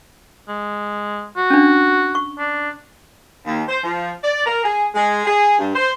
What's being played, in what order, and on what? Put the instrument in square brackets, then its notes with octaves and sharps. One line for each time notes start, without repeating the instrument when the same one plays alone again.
[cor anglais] G#3
F#4
[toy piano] C#4 D4
C#6
[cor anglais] D4
[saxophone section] D#2
C5
F3
D5
A#4
G#4
G#3
G#4
G2
C5